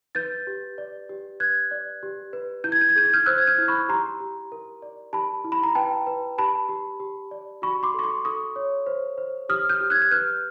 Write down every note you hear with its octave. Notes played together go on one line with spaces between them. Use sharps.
B4 G6 A6
G4
D5
G4
B4 F#6 G#6
D5
G4
B4
E4 G6
G#6
G6
G#6
G#4 G6
G#6
F6 G6
C5 E6 F#6
G#6
F6 G6
E4
B5 C#6
G4 A#5 C6
G4
A#4
D5
G4 A5 B5
E4
B5
A#5
B4 G5 A5
B4
G4 A5 B5
G4
G4
D5
F#4 B5 C#6
C6 D6
A4 C#6
C6 D6
A4 C#6 D#6
C#5
C5
C5
G4 D#6 F6
F6 G6
G4
F#6 G#6
F#6
B4 F6 G6